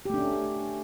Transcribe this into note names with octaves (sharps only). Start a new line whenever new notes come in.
A3 C#4 D4 G4